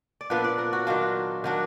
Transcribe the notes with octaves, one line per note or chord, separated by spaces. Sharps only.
D5
A#2 F3 B3 D4 B4
D5
A#4
F#4
D#3 F#3 D4 F4
D#3 F#3 D4